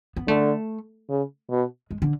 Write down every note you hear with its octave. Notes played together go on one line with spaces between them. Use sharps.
B3
D3 A3
C#3
B2
G#3
D3